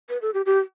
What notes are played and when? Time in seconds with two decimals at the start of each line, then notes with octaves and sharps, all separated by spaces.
0.09 B4
0.22 A4
0.34 G4
0.46 G4